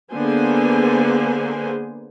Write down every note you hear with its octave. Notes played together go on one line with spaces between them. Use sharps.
D3 A#3 B3 G#4 C5 G#5